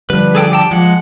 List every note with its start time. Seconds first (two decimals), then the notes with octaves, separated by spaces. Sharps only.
0.10 D3 F3 G3 B4
0.35 G#4 A4 G5
0.52 D5 G5 A5
0.71 F3 G#3 F#5